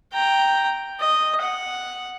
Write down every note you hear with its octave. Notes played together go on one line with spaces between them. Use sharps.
G5 A#5
D#5
F#5